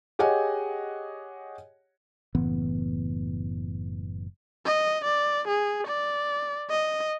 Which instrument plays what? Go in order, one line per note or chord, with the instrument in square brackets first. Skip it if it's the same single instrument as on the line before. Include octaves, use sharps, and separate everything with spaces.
[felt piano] G4 G#4 C#5 D#5 F#5 G#5
[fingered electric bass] F#1 A2 E3 B3
[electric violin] D#5
D5
G#4
D5
D#5